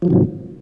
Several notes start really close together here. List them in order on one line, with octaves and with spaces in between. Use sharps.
F3 F#3 D#3 C3 G#2